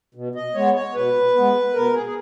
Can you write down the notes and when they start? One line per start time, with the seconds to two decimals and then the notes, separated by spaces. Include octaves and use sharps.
0.15 B2
0.35 D#5
0.54 G#3 B3 C#5
0.75 C#5
0.94 B2 B4
1.35 G#3 B3
1.74 B2 A#4
1.94 G#4
2.06 G#4